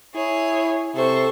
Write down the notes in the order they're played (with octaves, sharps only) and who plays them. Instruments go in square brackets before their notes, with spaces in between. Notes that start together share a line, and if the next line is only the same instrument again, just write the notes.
[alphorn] E4 [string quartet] G#4 C#5
[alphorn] C3 [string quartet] A4 C5 C#6